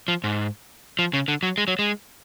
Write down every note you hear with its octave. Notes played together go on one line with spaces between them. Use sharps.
F3
G#2
F3
C#3
D3
F#3
G#3
F#3
G#3